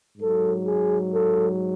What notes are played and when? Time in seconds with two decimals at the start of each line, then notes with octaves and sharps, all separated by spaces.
0.17 G#2 F#3 A4
0.65 G#4
1.12 A4